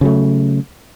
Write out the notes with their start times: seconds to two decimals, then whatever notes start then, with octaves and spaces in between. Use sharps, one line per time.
0.01 C#3 F#3 A3